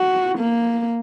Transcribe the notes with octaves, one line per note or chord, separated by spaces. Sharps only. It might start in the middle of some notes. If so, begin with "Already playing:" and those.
Already playing: F#4
A#3